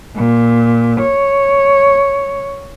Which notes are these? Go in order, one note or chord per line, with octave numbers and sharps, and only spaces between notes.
A#2
C#5